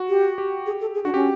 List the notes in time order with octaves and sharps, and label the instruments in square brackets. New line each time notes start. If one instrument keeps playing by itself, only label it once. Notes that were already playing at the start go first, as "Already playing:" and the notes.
Already playing: [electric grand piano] F#4
[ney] G4
[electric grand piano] G4
[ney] G#4
A4
G#4
[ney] D4 [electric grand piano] F#4
[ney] C#4 [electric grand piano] G4